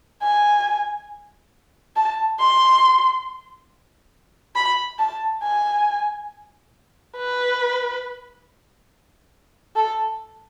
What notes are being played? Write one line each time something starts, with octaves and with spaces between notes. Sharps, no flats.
G#5
A5
C6
B5
A5
G#5
B4
A4